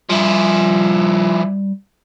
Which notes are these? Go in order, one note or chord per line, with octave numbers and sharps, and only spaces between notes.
F3 G3 E4